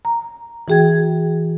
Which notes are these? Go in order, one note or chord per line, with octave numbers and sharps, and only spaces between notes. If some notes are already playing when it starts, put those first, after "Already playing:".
A#5
E3 F#4 G#4 G5 G#6